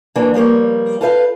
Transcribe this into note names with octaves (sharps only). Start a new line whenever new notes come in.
C#3 E3 F#3 A#3 D4
F3 G3 A#3 C#5
F4 A4 B4 C5 E5 F5